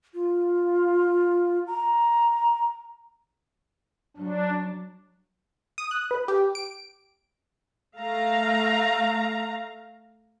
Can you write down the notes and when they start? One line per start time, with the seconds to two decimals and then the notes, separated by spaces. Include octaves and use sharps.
0.14 F4
1.67 A#5
4.17 F#3 D4
5.78 D#6
5.91 F#6
6.11 B4
6.28 G4
6.55 D7
7.97 A3 F5 A#5